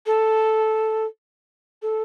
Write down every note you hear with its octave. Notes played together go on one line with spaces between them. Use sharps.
A4
A4